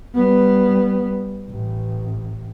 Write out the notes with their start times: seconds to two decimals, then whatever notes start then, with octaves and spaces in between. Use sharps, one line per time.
0.15 G3 B3
1.50 A1